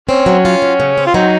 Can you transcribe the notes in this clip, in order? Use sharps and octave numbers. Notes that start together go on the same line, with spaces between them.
C4 C#4
F#3
F4
F#3
C#3
C4
F4
F#3 D#4